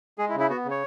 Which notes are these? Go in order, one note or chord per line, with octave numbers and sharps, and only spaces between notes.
G#3 G#4
E4
C#3
E4
B3 F#4
C#3
C#5